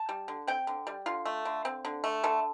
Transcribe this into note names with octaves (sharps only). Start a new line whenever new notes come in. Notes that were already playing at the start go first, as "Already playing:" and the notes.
Already playing: A5
G3
D3
C4 G5
D3
G3
D3 F4
A3
D3
C4
D3
A3
D3 A4